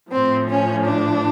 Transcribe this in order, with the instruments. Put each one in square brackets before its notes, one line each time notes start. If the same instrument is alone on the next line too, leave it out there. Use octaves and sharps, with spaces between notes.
[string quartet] A2 F3 C4
C#4
D4